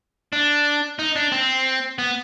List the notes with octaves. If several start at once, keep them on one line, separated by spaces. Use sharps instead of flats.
D4
D#4
D4
C4
B3